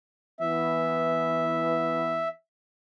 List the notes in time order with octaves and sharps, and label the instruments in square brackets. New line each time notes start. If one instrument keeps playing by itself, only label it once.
[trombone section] E3 B3 [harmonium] E5